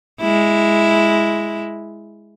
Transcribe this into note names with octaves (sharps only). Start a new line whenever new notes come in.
G#3 E4